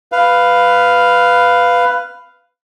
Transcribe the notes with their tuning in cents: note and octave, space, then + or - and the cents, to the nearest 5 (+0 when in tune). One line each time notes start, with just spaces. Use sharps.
B4 +10 F5 +0